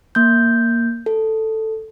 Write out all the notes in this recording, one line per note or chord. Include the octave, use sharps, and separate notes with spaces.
A#3 G6
A4